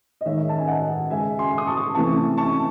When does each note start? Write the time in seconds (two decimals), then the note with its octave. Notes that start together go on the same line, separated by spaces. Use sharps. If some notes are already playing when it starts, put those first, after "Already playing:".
0.21 D#5
0.26 D#3 G#3 C#5 E5
0.49 A5
0.58 G#5
0.67 D#5 F#5
1.10 C#3 G#3 E5 G#5
1.39 G#5 C6
1.58 D#6
1.67 A5 C#6
1.95 C3 E3 A3 A5 C#6
2.38 A5 C#6